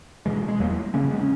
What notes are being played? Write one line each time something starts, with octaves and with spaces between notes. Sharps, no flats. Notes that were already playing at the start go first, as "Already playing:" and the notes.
B2 E3 G#3
G#3
E2 F#3 A#3
C#3 A#3 C#4
G#3 B3
C#4